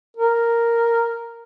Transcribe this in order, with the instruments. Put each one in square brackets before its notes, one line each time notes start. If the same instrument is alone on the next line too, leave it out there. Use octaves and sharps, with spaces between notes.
[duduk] A#4